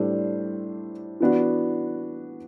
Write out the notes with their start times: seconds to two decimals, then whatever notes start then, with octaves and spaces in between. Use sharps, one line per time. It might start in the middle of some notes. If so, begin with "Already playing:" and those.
Already playing: A2 G3 D4 A4 C5
1.20 E3 B3 D4 F#4